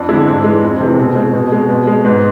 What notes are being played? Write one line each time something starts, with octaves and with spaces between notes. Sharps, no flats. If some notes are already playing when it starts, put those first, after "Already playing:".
Already playing: F2 D4
D3 G#3 E4
G#2 D4
E3 G#3
F2
C3 E3 G#3
B2 C4
G#3 C4
B2
G#3
B2
G#3
G#2 B3